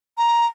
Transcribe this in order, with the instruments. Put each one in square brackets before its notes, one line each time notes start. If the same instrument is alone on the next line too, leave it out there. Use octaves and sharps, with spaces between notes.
[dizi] A#5